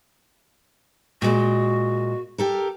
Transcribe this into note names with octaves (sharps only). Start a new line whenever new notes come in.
A#2 G#3 F#4
G4 A4 A#4